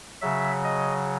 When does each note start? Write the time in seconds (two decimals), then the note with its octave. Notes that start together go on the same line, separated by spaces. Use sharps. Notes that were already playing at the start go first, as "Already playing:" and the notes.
0.22 C#3 F#3 E5
0.64 D#5